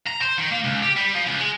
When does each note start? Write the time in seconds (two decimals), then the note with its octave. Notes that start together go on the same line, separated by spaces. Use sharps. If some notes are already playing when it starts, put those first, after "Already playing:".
0.07 A#5
0.21 C5
0.38 D#3
0.51 A#3
0.64 C#2
0.83 G4
0.96 G3
1.14 F3
1.27 C#2
1.38 G#3